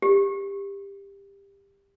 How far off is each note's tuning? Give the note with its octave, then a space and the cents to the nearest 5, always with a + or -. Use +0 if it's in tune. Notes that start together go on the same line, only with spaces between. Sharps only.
G4 +20